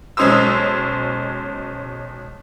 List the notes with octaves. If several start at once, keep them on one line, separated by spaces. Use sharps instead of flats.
B1 G#3 C#4 C5 D#6 E6